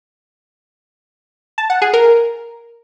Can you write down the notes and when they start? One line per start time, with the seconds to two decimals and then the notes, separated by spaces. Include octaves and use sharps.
1.58 A5
1.70 F#5
1.82 G#4
1.93 A#4